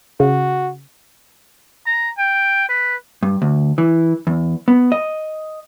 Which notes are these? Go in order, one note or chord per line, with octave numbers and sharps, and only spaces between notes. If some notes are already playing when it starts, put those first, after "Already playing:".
C#3 F#4
A#5
G5
B4
G2
D2
E3
E2
B3
D#5